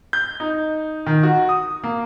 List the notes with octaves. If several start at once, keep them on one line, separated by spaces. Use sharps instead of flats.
G6
D#4
D#3
F#4
D#6
A#3